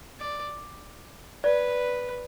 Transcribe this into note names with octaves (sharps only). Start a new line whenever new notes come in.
D5
B4 D5